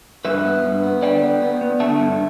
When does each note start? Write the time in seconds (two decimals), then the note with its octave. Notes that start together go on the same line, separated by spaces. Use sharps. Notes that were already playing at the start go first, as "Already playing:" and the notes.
0.25 G2 B4 E5
0.45 B3
0.64 G2
0.83 B3
1.02 D3 D5 G5
1.22 B3
1.42 B3
1.61 B3
1.80 D3 E5 A5
2.00 G2